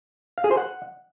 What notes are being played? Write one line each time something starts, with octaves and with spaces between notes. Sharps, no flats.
F5
G#4
C5
F#5